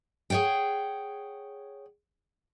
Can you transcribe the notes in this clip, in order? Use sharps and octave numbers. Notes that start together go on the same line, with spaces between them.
G#4 C#5 D5 F#5 G5